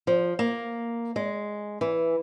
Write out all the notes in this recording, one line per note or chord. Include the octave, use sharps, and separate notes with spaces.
F3
A#3
G#3
E3